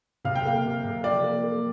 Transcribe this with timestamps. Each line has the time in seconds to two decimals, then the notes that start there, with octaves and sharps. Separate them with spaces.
0.25 C3 F5
0.35 G5
0.45 A#3 F5
0.65 C3
0.84 C3
1.04 F3 D5
1.24 A#3
1.44 A#3